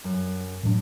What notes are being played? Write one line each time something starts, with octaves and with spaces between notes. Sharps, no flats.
F#2
A2 F#3 D4